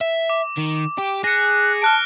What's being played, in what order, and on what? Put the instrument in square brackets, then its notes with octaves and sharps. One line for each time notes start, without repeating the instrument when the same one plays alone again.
[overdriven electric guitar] E5
[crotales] D6
[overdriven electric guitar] D#3
G4
[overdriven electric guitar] G#4 [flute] F#6 [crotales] A#6 C#7
[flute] A5 [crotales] F6 F#6 D7